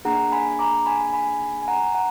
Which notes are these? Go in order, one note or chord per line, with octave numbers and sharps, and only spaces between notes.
A#3 D4 G#4 F#5 A#5
G#5 B5
A#5 D6
G#5 B5
G#5 B5
G#5
F#5 A#5
F#5 A#5